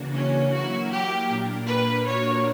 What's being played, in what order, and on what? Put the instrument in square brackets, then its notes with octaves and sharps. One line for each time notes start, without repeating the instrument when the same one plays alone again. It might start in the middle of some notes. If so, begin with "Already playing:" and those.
Already playing: [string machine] C#3 E3 A#3 D4 F#4
[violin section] C#4
[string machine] F#3 A#3 E4 A#4 [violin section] F#4
[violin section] G4
[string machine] A#2 A#3 D4 A#4
[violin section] B4
[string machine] A#2 A#3 D4 F#4 A#4 [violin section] C#5